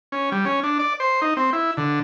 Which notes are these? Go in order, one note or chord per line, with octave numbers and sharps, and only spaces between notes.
C#4
G3
C#4
D4
D5
C5
D#4
C4
E4
D3